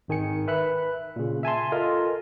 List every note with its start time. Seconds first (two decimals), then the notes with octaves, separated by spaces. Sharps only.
0.08 G#1 D#3 G#5 C#7
0.48 B4 E5 B5 F#6
1.16 A#2 C#3
1.43 E5 G#5 A5 C6
1.72 F4 A4 A#4 D#5 G#5